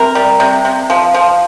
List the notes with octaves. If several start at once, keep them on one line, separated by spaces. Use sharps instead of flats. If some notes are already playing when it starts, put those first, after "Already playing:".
Already playing: C3 A#4
G3
C3
C3
F3
F3